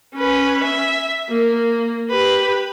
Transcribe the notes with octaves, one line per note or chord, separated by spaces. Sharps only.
C#4 B4
E5
A#3
G4 B4